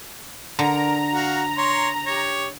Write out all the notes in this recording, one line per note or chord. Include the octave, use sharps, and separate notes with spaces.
D3 A#4 A#5
F#4 F5
C#5 C6
G4 C#5